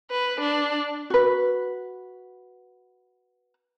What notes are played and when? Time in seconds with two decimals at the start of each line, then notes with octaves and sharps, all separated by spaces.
0.11 B4
0.42 D4
1.10 F#4 B4